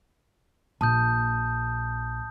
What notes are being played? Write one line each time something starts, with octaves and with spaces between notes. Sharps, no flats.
A#1 A5 D#6 G6